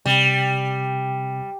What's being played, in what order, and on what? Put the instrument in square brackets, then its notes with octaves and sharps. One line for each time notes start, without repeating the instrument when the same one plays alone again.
[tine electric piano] C3 [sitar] G3